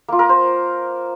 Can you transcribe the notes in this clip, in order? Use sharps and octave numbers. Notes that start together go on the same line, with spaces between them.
A#3 F4
A#4
C5